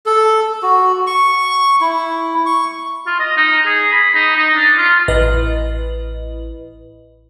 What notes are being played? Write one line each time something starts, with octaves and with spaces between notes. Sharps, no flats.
A4
F#4
C#6
E4
C#6
F4
D#5
D#4
G#4
B5
D#4
D#4
D4
F4
A1 B4 D#5